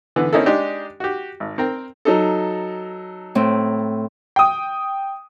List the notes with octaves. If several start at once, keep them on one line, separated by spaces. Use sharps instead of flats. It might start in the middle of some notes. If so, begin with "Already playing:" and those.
D3 E3 B3
A#3 C4 C#4 D#4 E4 A4
G#3 D4 D#4 G4
F#4 G4
G#1
C4 A#4 G5
F#3 D#4 A4
A2 C4
G5 D#6